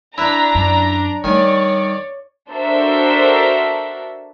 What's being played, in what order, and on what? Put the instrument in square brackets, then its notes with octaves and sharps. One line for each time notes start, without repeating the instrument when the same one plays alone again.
[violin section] D4 A#5 [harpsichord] E4 B4
[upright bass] F#2
[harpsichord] D#3 G#5 [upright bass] G3 A3 [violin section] C#5 D5
[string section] D4 F#4 A4 A#4 C5 E5